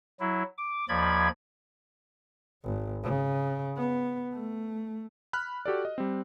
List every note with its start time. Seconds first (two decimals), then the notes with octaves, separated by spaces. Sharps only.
0.20 F#3 E4
0.58 D6
0.89 D#2 F3 D5 B5 G#6
2.64 G#1
3.04 C#3
3.77 B3
4.33 A3
5.33 B5 F6 F#6
5.66 F#4 G4 A4 D5
5.85 D#5
5.98 G3 C4